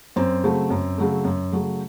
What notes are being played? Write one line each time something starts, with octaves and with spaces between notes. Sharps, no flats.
F#2 C4
C#3 F#3 A3
F#2
C#3 F#3 A3
F#2
C#3 F#3 A3